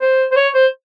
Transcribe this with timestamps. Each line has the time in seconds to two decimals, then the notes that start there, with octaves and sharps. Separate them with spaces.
0.01 C5
0.32 C5
0.36 C#5
0.54 C5